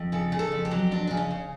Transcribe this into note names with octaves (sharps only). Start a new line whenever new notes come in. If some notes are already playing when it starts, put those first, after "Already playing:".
Already playing: F2
C#3 A4
C#3
A4
F2
G4
F#3
F2 D4
C#3 D4
C#4
C#3